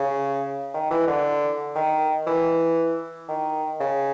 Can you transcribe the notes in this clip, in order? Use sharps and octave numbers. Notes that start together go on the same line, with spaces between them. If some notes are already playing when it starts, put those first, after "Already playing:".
Already playing: C#3
D#3
E3
D3
D#3
E3
D#3
C#3